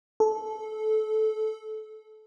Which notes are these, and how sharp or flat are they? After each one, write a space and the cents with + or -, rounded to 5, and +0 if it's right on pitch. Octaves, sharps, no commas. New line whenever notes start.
A4 -20